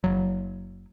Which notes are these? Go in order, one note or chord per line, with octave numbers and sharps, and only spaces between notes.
F#1 F#3